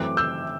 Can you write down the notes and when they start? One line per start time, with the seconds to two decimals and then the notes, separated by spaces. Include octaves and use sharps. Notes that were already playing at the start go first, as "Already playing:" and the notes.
Already playing: F#2 E3 A3 C4 D6 F#6
0.17 E6 G6